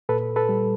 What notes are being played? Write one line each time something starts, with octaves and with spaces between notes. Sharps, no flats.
A#2 A4 B4
A4 B4
G3